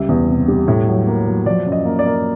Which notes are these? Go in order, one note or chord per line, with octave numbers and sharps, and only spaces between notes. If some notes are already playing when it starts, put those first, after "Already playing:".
Already playing: C#2 G3 E5
E2
C3
G3
A2
F#3
A#3
F#3
F3 D5
F#2
D#5
A#3
D5
A#3